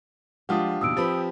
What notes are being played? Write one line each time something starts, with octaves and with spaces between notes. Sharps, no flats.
F3 G#3 D4 F4 G4 D#5 F#5 D#6
D#2 B2 F3 D#6 E6 D7
F3 C4 G4 B4 B5